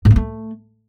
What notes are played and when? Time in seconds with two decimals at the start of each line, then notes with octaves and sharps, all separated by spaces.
0.05 G#2
0.10 A#3
0.16 A3